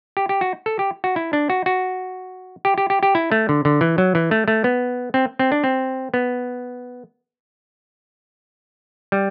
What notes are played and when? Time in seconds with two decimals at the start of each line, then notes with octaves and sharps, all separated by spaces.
0.17 G4
0.29 G4
0.41 F#4
0.66 A4
0.79 G4
1.04 F#4
1.16 E4
1.33 D4
1.50 F#4
1.66 F#4
2.65 G4
2.78 G4
2.90 G4
3.03 G4
3.15 E4
3.32 A3
3.49 D3
3.65 D3
3.81 E3
3.98 F#3
4.15 E3
4.31 A3
4.48 A3
4.64 B3
5.14 C4
5.39 C4
5.52 D4
5.64 C4
6.14 B3
9.12 G3